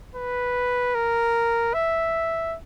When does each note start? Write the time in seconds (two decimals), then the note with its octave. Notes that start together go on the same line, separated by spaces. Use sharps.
0.15 B4
0.95 A#4
1.74 E5